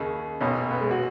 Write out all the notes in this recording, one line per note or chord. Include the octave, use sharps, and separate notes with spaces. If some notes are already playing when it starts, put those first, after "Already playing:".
Already playing: D#2 C#3
B1 B2 C#4
B3
G#3
F#4